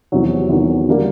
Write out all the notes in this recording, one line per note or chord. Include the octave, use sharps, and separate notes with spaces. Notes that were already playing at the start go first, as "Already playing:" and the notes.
E2 C3 D#3 F#3
E2 C3 D#3 F#3
D3 G3 A#3